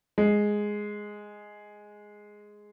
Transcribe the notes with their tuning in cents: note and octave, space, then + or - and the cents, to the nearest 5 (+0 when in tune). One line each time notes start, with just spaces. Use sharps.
G#3 +0